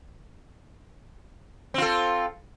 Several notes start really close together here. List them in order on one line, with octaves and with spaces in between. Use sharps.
C4 F4 A4